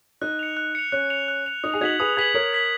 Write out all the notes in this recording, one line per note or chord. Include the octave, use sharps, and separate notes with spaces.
D#4 F#6
C#7 F7
F#6
C#7 F7
C#4 F#6
C#7 F7
F#6
C#7 F7
D#4 D#6
G#4
D#4 F#4 G#6 B6 F#7
G#4 B4 D#6
G#4 B4 G#6 B6 F#7
A#4 C#5 D#6
G#6 B6 F#7